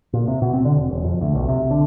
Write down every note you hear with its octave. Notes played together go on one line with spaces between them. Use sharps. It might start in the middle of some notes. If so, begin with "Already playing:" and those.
A#2
C3
B2
C4
D3
E1
E1
F2
D2
B1
C3
D3